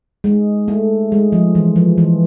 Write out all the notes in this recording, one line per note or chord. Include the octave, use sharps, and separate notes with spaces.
G#3
A3
G#3
F3
E3
F3
E3